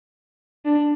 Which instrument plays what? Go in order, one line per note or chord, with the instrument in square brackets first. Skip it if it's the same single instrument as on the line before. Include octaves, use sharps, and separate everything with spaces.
[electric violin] D4